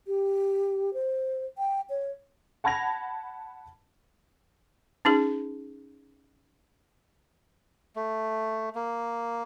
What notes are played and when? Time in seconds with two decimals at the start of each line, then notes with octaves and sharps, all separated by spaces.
0.07 G4
0.94 C5
1.58 G5
1.90 C#5
2.64 F#5 A5 B5 G#6 A#6 F7
5.05 C#4 D#4 G#4
7.96 A3
8.75 A#3